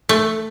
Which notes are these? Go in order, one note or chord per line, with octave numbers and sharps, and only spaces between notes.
A3